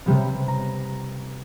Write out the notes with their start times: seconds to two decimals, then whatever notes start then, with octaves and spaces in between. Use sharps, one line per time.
0.06 C3 G3 B3
0.48 A#5